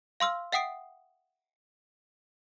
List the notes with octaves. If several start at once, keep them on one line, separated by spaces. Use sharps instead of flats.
F5 C6 E6 F6
E5 F#5 G5 D#6 C7 D7